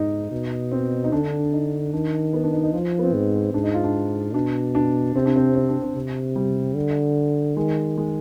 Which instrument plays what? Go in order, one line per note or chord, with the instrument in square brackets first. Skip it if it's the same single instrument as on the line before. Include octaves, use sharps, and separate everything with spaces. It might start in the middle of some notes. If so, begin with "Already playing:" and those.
Already playing: [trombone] G#2 [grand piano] D#4
[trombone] B2
[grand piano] C4
D#4
[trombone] D3 [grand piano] D4
[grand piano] D#4
[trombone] D#3 [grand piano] D4
[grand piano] B3
D4
D#4
D#4
[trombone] F3 [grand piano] F4
[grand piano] B3
C4
[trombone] G#2
[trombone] G#2 [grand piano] D4
[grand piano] D#4
F4
D4
[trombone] B2 [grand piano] D4
[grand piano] D4
[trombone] C3 [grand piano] C4
[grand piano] D4
C4
C4
D4
C4
[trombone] C3
[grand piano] G3
[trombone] D3
[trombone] D#3 [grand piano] G#3
[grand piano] G#3